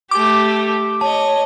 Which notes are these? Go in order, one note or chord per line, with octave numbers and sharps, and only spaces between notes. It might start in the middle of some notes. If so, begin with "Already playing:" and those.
A3 G4 D6
C#5 D#5 A5